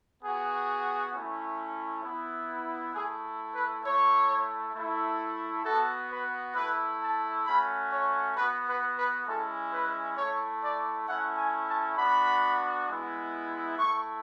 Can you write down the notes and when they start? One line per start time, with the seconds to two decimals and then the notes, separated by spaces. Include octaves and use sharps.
0.23 B3 F#4 G#4
1.13 A3 C#4 E4
2.03 B3 E4
2.94 A3 E4 G#4
3.54 B4
3.84 A3 E4 C#5
4.74 A3 E4
5.65 B3 F#4 A4
6.10 B4
6.55 A3 E4 B4
7.00 A5
7.45 A3 C#4 F#4 B5
7.91 C#5
8.36 B3 F#4 B4
8.67 B4
8.96 B4
9.27 G#3 C#4 E4 A4
9.71 B4
10.17 A3 E4 C#5
10.62 D5
11.07 A3 C#4 E4 F#5
11.37 G#5
11.67 A5
11.97 B3 D4 F#4 B5
12.88 G#3 B3 E4
13.78 A3 E4 C#6